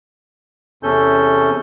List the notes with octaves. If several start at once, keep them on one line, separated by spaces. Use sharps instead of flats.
E2 C3 C#4 A4 G6